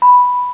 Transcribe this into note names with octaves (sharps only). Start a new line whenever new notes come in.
B5